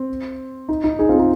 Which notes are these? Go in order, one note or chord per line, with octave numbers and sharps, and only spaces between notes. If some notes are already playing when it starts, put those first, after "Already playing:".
Already playing: C4
D#4
D#4
D#4 G#4
C4 F4
D#4 G#4